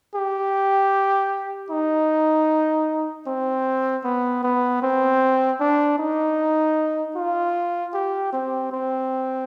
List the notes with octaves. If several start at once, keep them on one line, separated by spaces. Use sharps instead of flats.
G4
D#4
C4
B3
B3
C4
D4
D#4
F4
G4
C4
C4